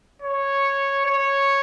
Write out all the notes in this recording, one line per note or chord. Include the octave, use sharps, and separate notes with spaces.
C#5
C#5